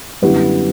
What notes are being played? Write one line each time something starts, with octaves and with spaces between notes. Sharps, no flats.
F#2 D3 G3 B3 E4